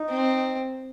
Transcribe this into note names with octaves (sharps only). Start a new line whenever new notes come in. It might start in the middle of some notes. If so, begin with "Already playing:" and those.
Already playing: D#4
C4